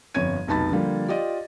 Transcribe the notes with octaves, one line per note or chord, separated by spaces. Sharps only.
G1 F2 C#5 G#6 D#7
F1 B1 D#4 A5 B5 A6
D3 F3 G3 A#3
F4 G4 D5 D#5